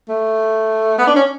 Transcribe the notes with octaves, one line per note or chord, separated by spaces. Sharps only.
A3
B3
D4
C#4